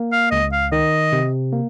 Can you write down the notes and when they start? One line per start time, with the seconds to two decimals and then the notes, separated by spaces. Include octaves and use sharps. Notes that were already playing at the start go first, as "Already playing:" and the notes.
Already playing: A#3
0.12 F5
0.31 C#2 D#5
0.53 F5
0.72 D#3 D#5
1.12 C3
1.53 A#3